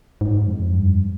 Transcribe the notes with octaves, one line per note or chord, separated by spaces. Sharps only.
G#2
F2
G2